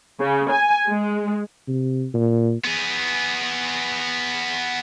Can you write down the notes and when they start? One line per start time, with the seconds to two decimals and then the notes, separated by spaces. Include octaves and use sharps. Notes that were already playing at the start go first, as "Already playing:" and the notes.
0.20 C#3
0.51 G#5
0.89 G#3
1.68 C3
2.14 A#2
2.64 B3 G#4